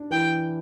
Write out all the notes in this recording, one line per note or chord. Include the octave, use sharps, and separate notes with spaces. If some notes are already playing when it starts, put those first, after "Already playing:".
Already playing: D4
E3 E4 G5